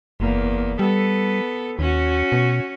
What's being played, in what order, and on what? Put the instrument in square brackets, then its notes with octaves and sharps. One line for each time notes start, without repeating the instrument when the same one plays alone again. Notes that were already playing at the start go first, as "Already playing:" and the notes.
[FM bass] F#1 [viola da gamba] E2 A#3
[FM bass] G3 [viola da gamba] B3 A4 B4
[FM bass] D#2 [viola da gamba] C#4 F#4
[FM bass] B2